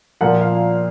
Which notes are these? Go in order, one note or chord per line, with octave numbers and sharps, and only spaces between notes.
A#2 F3 A#3 F#5
F5